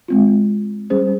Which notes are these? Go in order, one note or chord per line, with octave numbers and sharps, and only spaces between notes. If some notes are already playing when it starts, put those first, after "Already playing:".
G#3 C4 F4
G3 C#4 G#4 C5